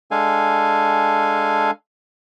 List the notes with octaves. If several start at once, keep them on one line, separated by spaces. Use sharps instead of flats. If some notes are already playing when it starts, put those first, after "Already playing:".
G#3 D4 A4 F5 G#5